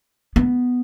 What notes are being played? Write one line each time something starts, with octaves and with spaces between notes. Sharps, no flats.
B3